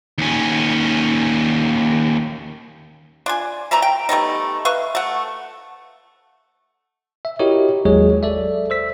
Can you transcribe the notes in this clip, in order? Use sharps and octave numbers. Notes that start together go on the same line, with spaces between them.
D#2 C#4
D4 F4 G#5
E3 A3 E5 A#5
G5
G3 A3 B3 D#4
B4 E5 F5 C#6
A3 F#5
E5
E4 F#4 G4 A#4 C#5 D#5
G1 D#2 F#3 G#3 G#4 C#5
A4 D5 E5
C5 E6 B6